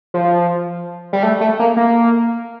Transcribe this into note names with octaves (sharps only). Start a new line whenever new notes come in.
F3
G3
A3
A3
A#3
A#3